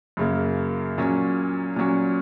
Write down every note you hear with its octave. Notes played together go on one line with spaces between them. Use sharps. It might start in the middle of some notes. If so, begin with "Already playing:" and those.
F#2 C#3 A#3
A#2 F#3 C#4
A#2 F#3 C#4